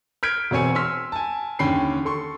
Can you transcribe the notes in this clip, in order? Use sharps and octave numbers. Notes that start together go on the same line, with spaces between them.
F6 G6 G#6 B6 D7
E1 C4 C#5 G#5 C#7
C6 E6 F6 B6
G#5 A5
D#2 D3 C#4 G5 B5 C7
A4 C6 C#6